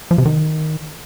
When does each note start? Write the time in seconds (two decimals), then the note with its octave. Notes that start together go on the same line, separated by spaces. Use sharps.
0.11 F3
0.18 C3
0.25 D#3